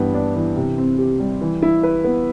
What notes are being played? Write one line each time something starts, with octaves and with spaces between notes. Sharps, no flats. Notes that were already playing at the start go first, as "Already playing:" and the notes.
Already playing: G2 E3 B3
D4
E3
C3
C4
G4
G3
E3
E4
B4
B3